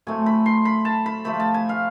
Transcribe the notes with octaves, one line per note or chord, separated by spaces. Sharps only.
A2 F#3 A3 C4 G#5
B5
C6
B5
A5
B5
C3 F3 A3 C4 B5
A5
G#5
F5